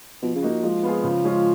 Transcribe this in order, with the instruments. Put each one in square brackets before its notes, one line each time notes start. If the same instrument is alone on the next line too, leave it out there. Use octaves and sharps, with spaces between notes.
[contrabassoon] B2 [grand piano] F3
[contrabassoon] C#3
[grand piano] A#3 D#4 F#4
[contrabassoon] F3 [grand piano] G#3
[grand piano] B3 F4 G#4
C#3
G#3 C#4 F4